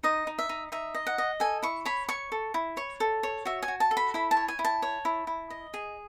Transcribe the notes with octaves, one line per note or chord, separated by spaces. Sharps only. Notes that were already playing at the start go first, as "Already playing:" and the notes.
D#4 D#5
D#4
E5
D#4
D#4 E5
D#5
F#5
D#5
A4 G#5
E4 C#6
C#5 B5
C#5 C#6
A4
E4
C#5 C#6
A4
C#5
F#4 E5
G#5
F#4
A5
A4
B5
E4 B5
A5
C#5
G#5
E4
A5
C#5
E4
E4
D#5
G#4